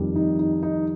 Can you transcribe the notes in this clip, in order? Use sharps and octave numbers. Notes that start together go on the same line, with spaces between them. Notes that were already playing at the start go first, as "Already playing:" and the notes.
Already playing: F2 D#3 G3
D#4
D#4
D#4